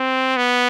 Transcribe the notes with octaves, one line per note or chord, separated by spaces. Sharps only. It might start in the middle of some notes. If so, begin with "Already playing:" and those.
Already playing: C4
B3